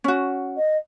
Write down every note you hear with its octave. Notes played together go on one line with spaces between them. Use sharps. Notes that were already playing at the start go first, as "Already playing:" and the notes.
C#4 F#4
D#5